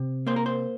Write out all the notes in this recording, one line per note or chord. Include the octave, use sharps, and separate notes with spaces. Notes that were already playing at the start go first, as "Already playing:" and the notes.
Already playing: C3
A#3 C5
A#4
C5